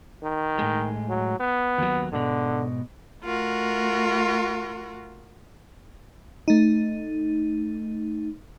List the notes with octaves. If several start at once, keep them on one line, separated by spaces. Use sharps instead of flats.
D#3
A2 G#3
F#3
B3
D#2 F#3
G#2 B2 D3
A3 F4 F#4 A#4
A3 D#4